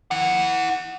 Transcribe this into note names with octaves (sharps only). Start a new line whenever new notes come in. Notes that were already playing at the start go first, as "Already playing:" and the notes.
E4 F#5